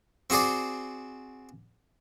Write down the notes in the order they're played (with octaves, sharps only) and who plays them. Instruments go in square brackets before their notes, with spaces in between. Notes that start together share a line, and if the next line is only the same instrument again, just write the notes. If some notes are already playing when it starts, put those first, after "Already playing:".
[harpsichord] C4 F#4 G#4 C5 D5